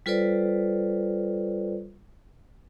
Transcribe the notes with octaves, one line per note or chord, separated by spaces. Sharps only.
G3 F4 A4 B4 C5 D5